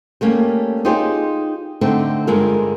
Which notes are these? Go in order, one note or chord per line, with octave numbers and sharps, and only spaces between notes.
G3 A3 A#3 C#4
D#4 F4 G4 G#4 C5
D3 A3 C4 D#4 G5
G2 D3 G#3 F4 A#4 F5